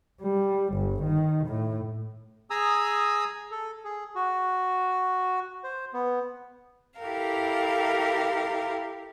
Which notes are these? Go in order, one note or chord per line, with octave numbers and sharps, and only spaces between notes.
G3
G1
D#3
A2
G#4 G#5 A#5 D#6 E6
A4
G#4
F#4
C5
B3
E4 G4 A4 A#4 F5